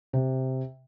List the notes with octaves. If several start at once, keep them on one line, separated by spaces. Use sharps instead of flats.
C3